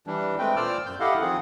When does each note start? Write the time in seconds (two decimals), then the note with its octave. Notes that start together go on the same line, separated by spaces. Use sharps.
0.07 E3 G3 D4
0.38 G#3 A3 C4 B4 G5
0.56 A#2 C5 D5 D6 E6 F6
0.86 F#2 G6
1.00 E4 G4 A4 D#5 F5 F#5
1.21 D#3 F3 C4 G#4 F#5